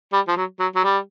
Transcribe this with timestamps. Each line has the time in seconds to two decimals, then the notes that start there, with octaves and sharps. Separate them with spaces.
0.13 G3
0.28 F3
0.37 F#3
0.60 F#3
0.75 F#3
0.84 G3